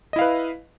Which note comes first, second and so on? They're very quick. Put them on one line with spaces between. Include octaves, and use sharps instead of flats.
D#5 E4 F5 B4